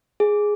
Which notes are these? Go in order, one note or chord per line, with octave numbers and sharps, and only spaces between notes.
G#4